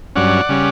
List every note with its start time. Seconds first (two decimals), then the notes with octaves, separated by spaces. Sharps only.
0.16 G2 F#3 C#4 D5 F#5
0.49 C#3 G3 C#4